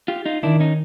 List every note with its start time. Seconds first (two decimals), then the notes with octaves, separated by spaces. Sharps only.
0.08 F4 G4
0.26 D#4 F4
0.43 D#3 D4 E4
0.60 C#4 D#4